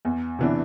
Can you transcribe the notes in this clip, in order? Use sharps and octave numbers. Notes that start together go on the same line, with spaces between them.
E2
C3 E3 B3 D4